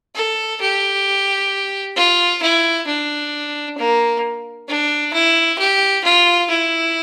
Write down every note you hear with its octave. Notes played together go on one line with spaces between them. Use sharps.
A4
G4
F4
E4
D4
A#3
D4
E4
G4
F4
E4